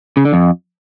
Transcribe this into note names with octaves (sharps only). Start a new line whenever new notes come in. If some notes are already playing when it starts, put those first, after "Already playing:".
C#3
D3
F2